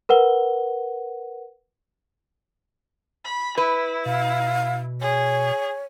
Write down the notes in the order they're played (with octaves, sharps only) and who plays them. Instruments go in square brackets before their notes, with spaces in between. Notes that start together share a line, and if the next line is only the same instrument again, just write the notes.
[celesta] A#4 B4 F#5 G7
[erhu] B5
[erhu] E4 [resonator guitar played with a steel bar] B4
[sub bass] B2 [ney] F5
[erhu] G#4 [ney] C#5